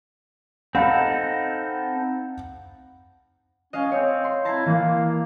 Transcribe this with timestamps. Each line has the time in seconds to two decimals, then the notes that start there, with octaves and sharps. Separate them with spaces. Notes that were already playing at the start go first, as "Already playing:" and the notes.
0.75 C4 D#4 A4 F5 F#5 B5
3.73 C#4 D#5 F5
3.91 C4 C#5
4.24 C6
4.45 E4 A5 A#5 C7
4.66 E3 A#3